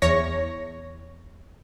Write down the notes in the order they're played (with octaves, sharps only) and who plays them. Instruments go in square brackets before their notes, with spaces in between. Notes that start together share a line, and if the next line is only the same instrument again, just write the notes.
[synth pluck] E2 C#5 A#6